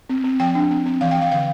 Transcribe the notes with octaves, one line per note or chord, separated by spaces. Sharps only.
C4
C4
F3 G5
D4
C4
C4
E3 F5
G5
E3
F5
D3 F5